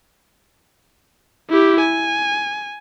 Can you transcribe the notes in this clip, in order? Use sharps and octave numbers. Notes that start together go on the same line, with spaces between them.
E4 G4
G#5